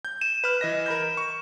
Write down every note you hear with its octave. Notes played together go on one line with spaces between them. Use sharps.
G6
D#7 E7
B4 F6
E3 D#5 A#6
A#4 B5 G6
C#6